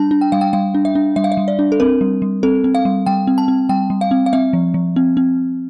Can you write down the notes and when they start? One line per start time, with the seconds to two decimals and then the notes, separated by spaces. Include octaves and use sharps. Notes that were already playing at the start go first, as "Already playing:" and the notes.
Already playing: G3 D4 A5
0.11 D4
0.21 G5
0.32 G3 F5
0.41 G5
0.53 G3 F5
0.75 D4
0.85 E5
0.95 D4
1.16 G3 E5
1.24 F5
1.32 E5
1.37 G3
1.48 D5
1.59 D4
1.72 A4
1.80 C4 A#4
2.01 G3
2.22 G3
2.43 C4 A4
2.64 C4
2.75 F5
2.85 G3
3.06 G3 G5
3.27 C4
3.38 A5
3.48 C4
3.69 G3 G5
3.90 G3
4.01 F5
4.11 C4
4.26 F5
4.33 C4 E5
4.53 F3
4.74 F3
4.96 C4
5.17 C4